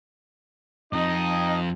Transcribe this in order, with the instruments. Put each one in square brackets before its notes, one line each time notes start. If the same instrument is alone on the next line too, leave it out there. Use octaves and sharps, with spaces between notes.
[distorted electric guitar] F2 [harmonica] D#4 D#5 D#6